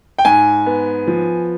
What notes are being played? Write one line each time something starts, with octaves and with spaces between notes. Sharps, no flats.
G5
G#2 G#5
B3
F3